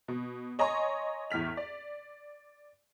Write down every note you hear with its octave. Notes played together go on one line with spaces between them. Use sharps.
B2
C#5 D#5 G#5 A#5 C6 C#6
E2 A2 F6 B6 F7
D5